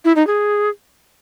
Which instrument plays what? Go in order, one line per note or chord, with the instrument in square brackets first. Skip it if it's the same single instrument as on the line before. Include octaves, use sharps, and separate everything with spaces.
[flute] E4
D#4
G#4